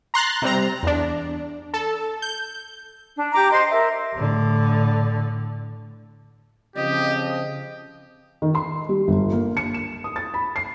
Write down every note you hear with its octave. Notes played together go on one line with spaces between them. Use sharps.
A#5 C6 F#6 A6
C3 G3 C4 A#5
E2 D4
A4
G6
D4
G4 A#5 D6
C5 D#5 C6
A#4 E5
A2 D3
C#3 F3 C4 G4 D#5
D#3
C6
G3
G1
A#3
C#7
E7
D#6
A6
B5
C7